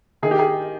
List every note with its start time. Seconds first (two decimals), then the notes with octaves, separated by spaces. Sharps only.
0.22 D#3 G#4
0.31 G4
0.39 G#4